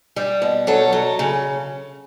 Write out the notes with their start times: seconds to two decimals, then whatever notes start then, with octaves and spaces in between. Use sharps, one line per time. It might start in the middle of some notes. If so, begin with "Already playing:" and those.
0.16 G3
0.42 B2
0.67 F#3 A4 C#5
0.93 F#3
1.19 C#3